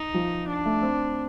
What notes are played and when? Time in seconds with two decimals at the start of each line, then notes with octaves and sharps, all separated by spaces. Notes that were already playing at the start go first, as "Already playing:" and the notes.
Already playing: D#4
0.14 F3
0.48 D4
0.66 A3
0.82 C4